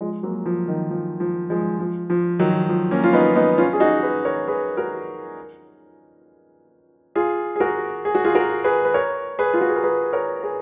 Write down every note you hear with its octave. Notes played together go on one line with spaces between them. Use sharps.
F3 G#3
F#3 A#3
F3
D#3
F3
F3
F3 G#3
F3
F3
D#3 F#3
F3
A#3 C#4
F4
B3 D#4
B3 D#4
C#4 F4
G#4
D#4 F#4
G#4 B4
A#4 C#5
G#4 B4
F#4 A#4
F4 G#4
G#4
F#4 A#4
G#4
F#4
F4 G#4
F#4 A#4
G#4 B4
B4
A#4 C#5
G#4 B4
F4
F#4
G#4
A#4
G#4 B4
A#4 C#5
G#4 B4